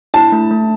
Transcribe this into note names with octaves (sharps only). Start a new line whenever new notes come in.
E4 A5
A3
A3